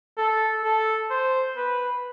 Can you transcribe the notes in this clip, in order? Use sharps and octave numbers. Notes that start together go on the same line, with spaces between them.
A4
A4
C5
B4